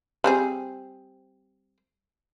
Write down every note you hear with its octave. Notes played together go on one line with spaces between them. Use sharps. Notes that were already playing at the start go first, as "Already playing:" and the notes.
G3 C4 G#4